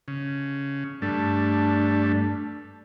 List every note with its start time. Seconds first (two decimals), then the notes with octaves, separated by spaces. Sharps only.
0.08 C#3
1.02 G2 A3 D4